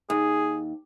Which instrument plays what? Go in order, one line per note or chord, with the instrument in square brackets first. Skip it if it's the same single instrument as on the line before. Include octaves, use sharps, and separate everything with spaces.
[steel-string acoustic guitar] D#2 [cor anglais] G#4